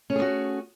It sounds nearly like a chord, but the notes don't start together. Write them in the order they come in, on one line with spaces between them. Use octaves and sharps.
C#4 A3 G#4 B3 F#4